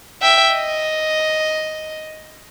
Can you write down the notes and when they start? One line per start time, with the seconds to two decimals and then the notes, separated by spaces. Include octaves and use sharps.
0.22 E5 G5
0.54 D#5